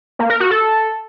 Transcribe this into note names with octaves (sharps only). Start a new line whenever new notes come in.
A#3
A#4
F#4
A4